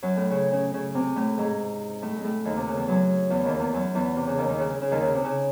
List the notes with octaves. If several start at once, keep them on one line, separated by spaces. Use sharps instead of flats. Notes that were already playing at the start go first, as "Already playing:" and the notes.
F#2 F#3
A2 A3
C#3 C#4
C#3 C#4
C#3 C#4
C3 C4
A2 A3
G#2 G#3
A2 A3
G#3
A2 A3
D#2 D#3
C3
C#3
E2 E3
F#2 F#3
E2 E3
D#2 D#3
E2 E3
F#2 F#3
E2 E3
C3
C#3
D#2 D#3
D#3
C#3
C#3
C#3
D#2 D#3
C#3
C3
C#3